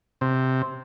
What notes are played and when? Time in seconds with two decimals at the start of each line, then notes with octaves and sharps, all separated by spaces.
0.21 C3